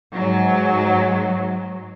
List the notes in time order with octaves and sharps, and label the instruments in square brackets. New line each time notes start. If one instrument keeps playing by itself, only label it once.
[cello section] G#2 F#3